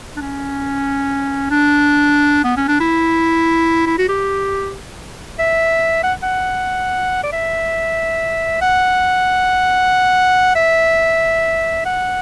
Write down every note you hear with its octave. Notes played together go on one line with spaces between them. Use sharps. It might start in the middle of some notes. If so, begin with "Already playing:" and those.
D4
C#4
D4
B3
C#4
D4
E4
E4
F#4
G4
E5
F#5
F#5
D5
E5
F#5
E5
F#5